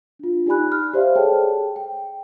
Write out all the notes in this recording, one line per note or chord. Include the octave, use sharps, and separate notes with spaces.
D4 F4
D#4 G4 D5 G#5 B5 F#6
F6
G4 C5 D5 E5 F5
G#4 A4 C#5 G5 A5
G5